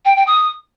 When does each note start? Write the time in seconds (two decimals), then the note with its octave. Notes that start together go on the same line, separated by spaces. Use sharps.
0.05 G5
0.16 G5
0.27 D#6